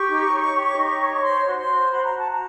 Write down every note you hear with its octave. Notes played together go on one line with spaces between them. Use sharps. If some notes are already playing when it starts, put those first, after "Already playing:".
Already playing: G4 C#6
D#4
C#5
G4
D#4
C#5
C5 C6
F#4
C6
C5
F#4 B5
A#5
F#4 A5
A#5